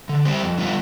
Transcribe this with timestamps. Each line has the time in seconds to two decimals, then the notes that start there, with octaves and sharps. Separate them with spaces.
0.09 D3
0.25 G3 C4 G4 C5
0.41 F2
0.57 D3 G3 B3 F4